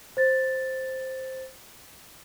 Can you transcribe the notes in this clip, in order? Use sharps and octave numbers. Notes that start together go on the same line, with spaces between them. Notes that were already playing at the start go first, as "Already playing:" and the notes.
C5 A6